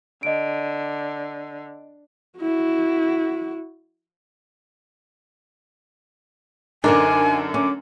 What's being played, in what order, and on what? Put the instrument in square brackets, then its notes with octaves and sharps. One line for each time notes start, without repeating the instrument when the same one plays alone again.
[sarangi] D3 [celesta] D#5 D7
[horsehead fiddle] E4 F#4
[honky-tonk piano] F#2 D3 [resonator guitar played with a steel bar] D4 [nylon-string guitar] D#4 A#4 C5 [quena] G#5
[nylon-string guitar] C#4 [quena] D6